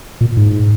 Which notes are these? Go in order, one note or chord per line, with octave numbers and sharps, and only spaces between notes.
A#2
G#2